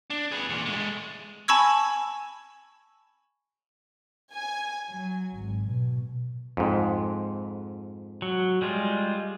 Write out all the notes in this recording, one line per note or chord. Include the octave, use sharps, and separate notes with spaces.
D4
G#4 B4
E2 A#2
G#3 A3
G#5 A5 B5 C#6 E6 G#6
G#5
F#3
G#1
B2
F2 G#2
F#3
G3 G#3 F4